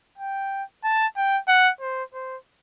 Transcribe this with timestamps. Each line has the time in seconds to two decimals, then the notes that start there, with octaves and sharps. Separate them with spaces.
0.18 G5
0.84 A5
1.16 G5
1.48 F#5
1.81 C5
2.13 C5